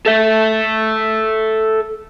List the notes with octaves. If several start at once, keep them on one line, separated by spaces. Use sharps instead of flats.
A4 E5